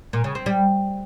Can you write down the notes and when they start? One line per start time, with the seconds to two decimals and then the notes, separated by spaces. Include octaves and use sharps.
0.13 A#2
0.24 C#3
0.35 C4
0.46 G3